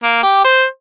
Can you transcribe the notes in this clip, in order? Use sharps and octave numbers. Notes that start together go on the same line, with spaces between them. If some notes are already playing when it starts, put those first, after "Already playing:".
A#3
G4
C5